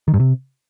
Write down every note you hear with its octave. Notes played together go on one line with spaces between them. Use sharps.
D#3
G2
C3